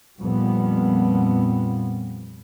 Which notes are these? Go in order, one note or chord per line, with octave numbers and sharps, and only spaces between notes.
F2 A#2 F3 G3 B3